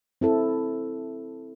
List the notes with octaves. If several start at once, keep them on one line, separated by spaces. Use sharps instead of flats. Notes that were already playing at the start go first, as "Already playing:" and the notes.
C4 E4 A4